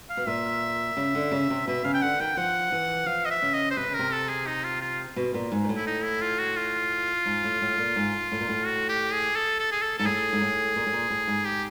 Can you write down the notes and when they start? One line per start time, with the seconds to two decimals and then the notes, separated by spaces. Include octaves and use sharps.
0.10 F5
0.17 B2
0.27 A#2 E5
0.97 C#3
1.15 D3
1.32 C#3
1.50 C3
1.67 B2 E5
1.84 C#3 F5
1.94 G5
2.02 D3 F#5
2.20 D#3 G5
2.37 F3 F#5
2.72 E3
3.06 F3 F5
3.25 D#5
3.30 E5
3.42 C#3
3.54 D#5
3.71 C5
3.77 C3 B4
3.88 C#3
3.94 C3 A#4
4.12 A4
4.29 G#4
4.47 D#4
4.64 F4
4.81 F4
5.16 B2
5.34 A#2
5.52 G#2
5.64 A#2
5.69 A2
5.76 E4
5.87 D#4
6.04 E4
6.21 F4
6.39 F#4
6.56 F4
7.26 G#2
7.44 A2
7.62 A2
7.78 A#2
7.96 G#2
8.32 A2
8.40 A#2
8.49 A2
8.66 F#4
8.89 G4
9.13 G#4
9.36 A4
9.59 A4
9.72 G#4
9.82 A4
9.98 G#2 A4
10.05 A2 G#4
10.33 G#2
10.41 A2
10.76 A#2
10.86 A2
10.93 A#2
11.10 A2
11.27 G#2
11.46 G4